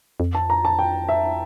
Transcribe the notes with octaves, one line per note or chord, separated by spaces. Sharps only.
F2
A5
A#5
A5
G5
E5